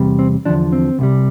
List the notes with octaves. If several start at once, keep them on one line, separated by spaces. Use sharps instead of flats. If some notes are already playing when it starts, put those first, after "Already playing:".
Already playing: E2 C3 G3
C4
E2 D3 F3 D4
C4
C2 C3 G3